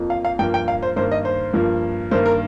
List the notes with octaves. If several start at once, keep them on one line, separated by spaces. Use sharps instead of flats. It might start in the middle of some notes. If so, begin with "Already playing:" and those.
Already playing: F2 F3 A#3
F5
F5
G2 F3 A#3 G5
G5
F5
C5
G2 D#3 A#3 C5
D#5
C5
G2 F3 A#3
G2 D#3 A#3 C5
A#4